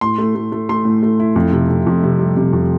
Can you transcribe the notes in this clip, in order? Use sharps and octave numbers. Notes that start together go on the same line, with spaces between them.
A2 C6
A3
A3
A3
A3 C6
A2
A3
E4
F2
C3
C3
F2
C3
G3
C3
F2